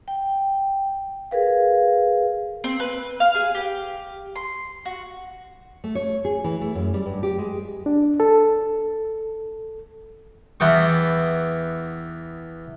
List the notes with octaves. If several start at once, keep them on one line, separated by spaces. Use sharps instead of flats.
G5
G#4 A#4 B4 F5
C4
B4
F5
G#4
G4
C6
F#4
A3
C#5
G#4
E3
A3
F#2
G3
G2
G4
G#3
D4
A4
E2 E3 B3 G4 C#6